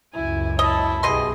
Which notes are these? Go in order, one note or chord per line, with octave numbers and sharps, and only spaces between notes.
C#2 F#2 E4 G#5
E4 C#5 D#5 A5
B1 B2 G4 G#4 D#5 C6